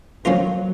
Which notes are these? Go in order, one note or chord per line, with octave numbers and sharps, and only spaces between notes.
F3 F#3 A#3 C#4 F4 A#4